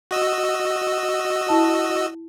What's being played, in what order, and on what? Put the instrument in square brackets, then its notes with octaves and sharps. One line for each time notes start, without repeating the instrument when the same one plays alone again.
[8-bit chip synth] F#4 D#5 E6
[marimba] E4 A5